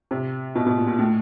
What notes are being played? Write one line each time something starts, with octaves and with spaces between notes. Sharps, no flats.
C3
B2
B2
A#2
A#2
A2